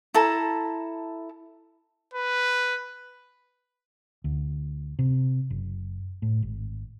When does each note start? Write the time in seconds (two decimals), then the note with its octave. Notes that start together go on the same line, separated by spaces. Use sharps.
0.14 E4 A4 A5 A#5
2.14 B4
4.24 D2
4.99 C3
5.50 F#1
6.22 A2
6.43 G#1